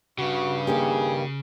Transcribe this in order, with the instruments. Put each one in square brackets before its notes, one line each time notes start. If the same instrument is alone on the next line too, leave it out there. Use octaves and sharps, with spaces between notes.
[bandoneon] G2 [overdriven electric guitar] C#3 [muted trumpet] F#4
[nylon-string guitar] D#3 A#3 G4 [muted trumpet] G#4